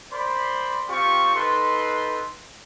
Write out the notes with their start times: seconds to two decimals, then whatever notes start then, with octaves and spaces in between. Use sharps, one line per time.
0.13 A#4 C5 D5 B5 C6
0.89 C4 F4 G4 C#6
1.35 D#4 A4 B4 C6